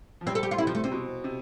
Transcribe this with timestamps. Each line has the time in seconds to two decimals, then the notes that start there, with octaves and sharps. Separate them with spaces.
0.21 F3
0.26 G3 C4
0.35 A4
0.43 G4
0.51 F4
0.58 C3 E4
0.67 F3
0.75 A3
0.84 C3 C4
0.92 B2
1.24 C3